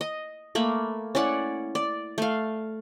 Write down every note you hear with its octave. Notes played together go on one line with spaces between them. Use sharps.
D#5
A3 A#3 B5
C#4 E4 D5 F#5
D5
A3 F5